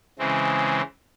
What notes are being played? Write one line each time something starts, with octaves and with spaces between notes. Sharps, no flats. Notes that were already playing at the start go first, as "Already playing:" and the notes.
C#3 E3 G#3 C4